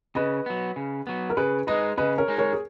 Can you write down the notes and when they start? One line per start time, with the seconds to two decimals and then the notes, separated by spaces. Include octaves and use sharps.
0.15 C#3 B4 D#5
0.46 F#3 B3
0.76 C#3
1.07 F#3 B3
1.30 A#4
1.37 C#3 G#4 B4
1.67 G#3 D#4 B4 D#5
1.97 C#3 B4 D#5
2.18 A#4 C#5
2.28 G#3 D#4
2.38 A#4 C#5
2.53 G#4